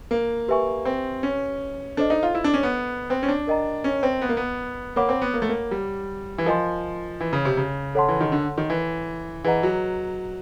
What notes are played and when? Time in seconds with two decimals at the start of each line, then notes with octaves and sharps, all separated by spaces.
0.11 A#3
0.48 G4 B4 E5 G#5 C#6
0.85 C4
1.23 C#4
1.97 D4 A4 C5 D#5
2.10 D#4
2.23 F4
2.35 E4
2.44 D4
2.54 C#4
2.63 B3
3.10 C4
3.23 C#4
3.29 D4
3.47 A#4 D#5 G5 A#5
3.84 C#4
4.03 C4
4.21 B3
4.29 A#3
4.37 B3
4.96 A#3 C#5 F#5 B5 D6
5.09 C4
5.21 B3
5.34 A#3
5.42 A3
5.49 A#3
5.71 G3
6.38 E3
6.46 F3 A#4 D#5 G#5 C6
7.21 E3
7.33 C#3
7.45 C3
7.57 C#3
7.95 A4 C#5 F#5 A5 C6
8.09 E3
8.21 D#3
8.32 D3
8.58 D#3
8.70 E3
9.44 E3 G#4 B4 D#5 F#5 A#5
9.63 F#3